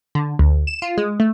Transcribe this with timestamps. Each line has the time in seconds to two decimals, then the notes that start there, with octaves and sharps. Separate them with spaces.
0.15 D3
0.39 D2
0.67 E7
0.82 F4
0.98 G#3
1.20 A3